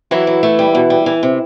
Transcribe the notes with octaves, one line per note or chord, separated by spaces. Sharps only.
E3 F#3 E4
F#3
A3
G3
B2
G3
E3
C3